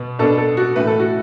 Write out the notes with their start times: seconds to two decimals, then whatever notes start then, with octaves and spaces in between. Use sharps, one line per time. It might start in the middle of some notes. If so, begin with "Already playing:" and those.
Already playing: B2 B3
0.19 B2 B3 D4 A4
0.38 A4
0.57 F#4
0.76 A2 E3 A3 B4
0.87 A4
1.00 F#4